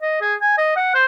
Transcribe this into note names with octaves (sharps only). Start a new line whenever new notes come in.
D#5
G#4
G#5
D#5
F#5
C5